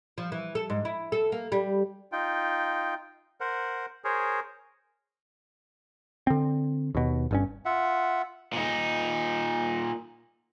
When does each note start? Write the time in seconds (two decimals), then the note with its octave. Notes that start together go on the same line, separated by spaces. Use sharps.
0.18 F3
0.32 E3
0.55 A4
0.70 G#2
0.85 E4
1.12 A4
1.32 A#3
1.52 G3
2.12 D#4 F4 G5
3.40 A#4 C5 F#5
4.04 G#4 A#4 C5 C#5
6.27 D3 C4
6.95 D#2 B2
7.31 G1 G2 C#4
7.65 F4 E5 F#5
8.53 A#2 D#4